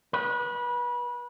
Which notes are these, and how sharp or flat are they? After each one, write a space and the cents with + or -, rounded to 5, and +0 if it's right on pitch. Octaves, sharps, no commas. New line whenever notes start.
B4 -25